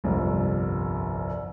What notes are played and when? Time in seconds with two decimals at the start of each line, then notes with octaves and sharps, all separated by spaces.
0.04 G1 C2 F2